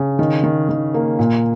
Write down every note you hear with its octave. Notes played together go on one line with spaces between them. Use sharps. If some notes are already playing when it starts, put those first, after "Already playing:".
Already playing: C#3
D#3
D#3
D#3
A#3
A#2